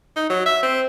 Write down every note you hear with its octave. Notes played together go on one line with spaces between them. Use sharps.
D#4
F#3
E5
C4